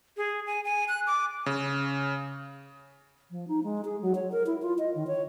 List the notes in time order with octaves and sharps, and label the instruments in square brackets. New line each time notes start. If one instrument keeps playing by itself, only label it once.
[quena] G#4
G#5
G#5
F#6
D6
[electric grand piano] C#3
[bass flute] F3
D#4
G#3
G#4
F#3
C#5
A#4
E4
F4
D#5
D#3
C#5